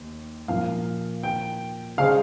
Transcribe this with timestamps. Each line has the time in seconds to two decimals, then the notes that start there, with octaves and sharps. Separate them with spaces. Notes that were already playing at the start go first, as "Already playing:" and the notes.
Already playing: D#2
0.48 A#2 F3 A#3 F5
1.23 G5
1.97 C#3 G#3 C#4 G#4 C5 F5